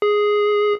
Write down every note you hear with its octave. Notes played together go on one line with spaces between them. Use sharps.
G#4